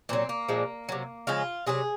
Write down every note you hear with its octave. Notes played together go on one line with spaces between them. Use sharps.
A#2 F#3 C4
A#3
A#2 F3 G#3
C3 F#3
C#3 F3 G#3 F4
C3 F#3 G#4